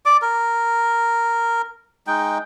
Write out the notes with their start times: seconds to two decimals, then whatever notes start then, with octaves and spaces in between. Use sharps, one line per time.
0.06 D5 D6
0.22 A#4
2.07 G#3 D#4 G5